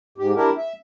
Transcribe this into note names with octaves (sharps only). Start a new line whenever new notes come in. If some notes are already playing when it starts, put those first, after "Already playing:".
G#2 G4
D4 E4 G4 A#4
E5